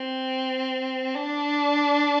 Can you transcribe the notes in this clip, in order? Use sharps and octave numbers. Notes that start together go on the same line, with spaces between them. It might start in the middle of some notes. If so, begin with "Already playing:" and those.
Already playing: C4
D4